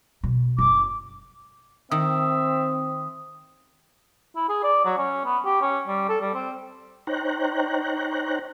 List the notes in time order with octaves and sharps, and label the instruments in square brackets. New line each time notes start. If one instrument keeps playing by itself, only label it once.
[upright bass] B2
[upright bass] F#1 [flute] D6
[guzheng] D#3 [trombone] C4 [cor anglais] E5 [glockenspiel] D#6
[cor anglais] E4
G#4
D5
F#3
C#4
B3
G4
C#4
G3
A4
G3
C4
[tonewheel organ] D#4 C5 C#5 G5 A#5 F#6